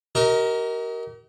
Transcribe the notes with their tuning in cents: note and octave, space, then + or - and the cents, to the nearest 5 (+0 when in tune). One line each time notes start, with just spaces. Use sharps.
G4 -45 A#4 +0 D#5 +30